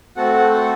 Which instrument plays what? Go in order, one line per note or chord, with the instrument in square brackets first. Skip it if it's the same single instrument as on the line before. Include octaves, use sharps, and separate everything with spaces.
[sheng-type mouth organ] A3 C4 F#4 A4 F#5